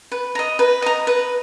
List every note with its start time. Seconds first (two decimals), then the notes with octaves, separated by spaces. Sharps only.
0.12 B4
0.35 D#5 A#5
0.59 B4
0.82 D#5 A#5
1.07 B4